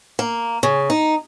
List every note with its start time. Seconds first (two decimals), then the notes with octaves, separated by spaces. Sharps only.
0.19 A#3
0.63 C#3
0.90 D#4